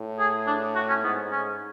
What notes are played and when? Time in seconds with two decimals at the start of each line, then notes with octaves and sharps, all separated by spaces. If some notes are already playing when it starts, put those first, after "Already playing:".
Already playing: A2
0.19 G#4
0.47 D4
0.75 F#4
0.89 C#4
1.04 G#2 B3
1.32 C#4